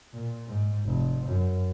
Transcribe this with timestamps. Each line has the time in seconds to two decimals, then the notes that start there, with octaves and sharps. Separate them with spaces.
0.13 A#2
0.47 G#2
0.85 F1
1.26 F#2